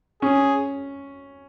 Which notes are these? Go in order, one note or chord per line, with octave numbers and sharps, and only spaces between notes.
C#4 G#4